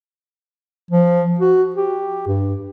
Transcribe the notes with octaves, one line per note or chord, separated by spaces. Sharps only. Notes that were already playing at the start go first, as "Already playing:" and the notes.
F3
F#4
G4
G2